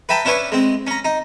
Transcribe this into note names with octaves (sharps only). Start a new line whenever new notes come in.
B4 E5 G5 A5 A#5
C#4 D4 E4 B4 C#5
G#3 C4
C#4 A#5
D#4